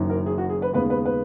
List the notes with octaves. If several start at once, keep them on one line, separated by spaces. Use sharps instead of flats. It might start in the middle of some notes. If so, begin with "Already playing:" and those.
Already playing: F#1 F#2 D#3
A#4
G#4
F#4
G#4
B4
D#2 C#3 G#3 B3 B4
B4
B4